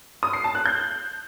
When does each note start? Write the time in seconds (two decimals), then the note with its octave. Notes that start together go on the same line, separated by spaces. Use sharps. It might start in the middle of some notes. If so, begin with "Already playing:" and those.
0.23 D#6
0.33 C7
0.44 A5
0.55 F#6
0.66 G6